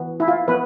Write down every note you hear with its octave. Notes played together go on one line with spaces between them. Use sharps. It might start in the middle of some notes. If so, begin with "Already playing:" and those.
Already playing: E3 B3
E4
F4
F3 B3 B4